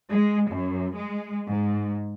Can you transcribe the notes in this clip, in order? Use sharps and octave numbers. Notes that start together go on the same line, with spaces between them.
G#3
F#2
G#3
G#2